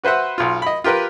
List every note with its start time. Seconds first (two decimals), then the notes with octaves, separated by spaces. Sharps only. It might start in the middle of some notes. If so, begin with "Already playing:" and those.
0.04 F#4 B4 C5 E5 F#5
0.38 B1 F4
0.62 D#5 B5
0.84 F4 G4 A#4 B4